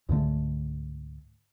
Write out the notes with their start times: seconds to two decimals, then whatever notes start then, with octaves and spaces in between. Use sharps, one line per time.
0.09 C#2 G#2 D3 A3